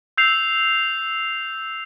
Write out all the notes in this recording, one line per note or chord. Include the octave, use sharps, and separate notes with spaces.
E6 G6 C7 F7